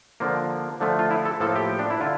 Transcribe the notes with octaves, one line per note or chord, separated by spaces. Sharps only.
D3 F3 A#3
D3 F3 A3
F4
E4
A4
A2 F3 A#3 A4
G4
D4
E4
D3 F4